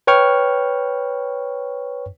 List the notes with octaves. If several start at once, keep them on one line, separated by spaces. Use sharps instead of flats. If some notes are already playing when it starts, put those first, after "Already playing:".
B4 C#5 G5 C#6 F6